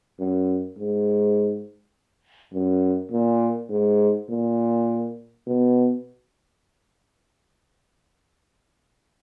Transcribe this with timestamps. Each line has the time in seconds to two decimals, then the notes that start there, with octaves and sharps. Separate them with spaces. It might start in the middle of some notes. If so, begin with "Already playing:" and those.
0.20 F#2
0.79 G#2
2.54 F#2
3.12 A#2
3.70 G#2
4.29 A#2
5.47 B2